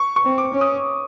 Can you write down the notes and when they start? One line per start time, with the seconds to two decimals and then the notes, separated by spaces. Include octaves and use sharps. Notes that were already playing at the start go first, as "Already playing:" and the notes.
Already playing: C#6
0.16 C#6
0.23 C4
0.38 D6
0.53 C#4
0.61 D#6